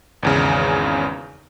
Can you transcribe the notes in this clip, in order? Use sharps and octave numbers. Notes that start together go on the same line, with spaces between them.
G#1 E2 C#3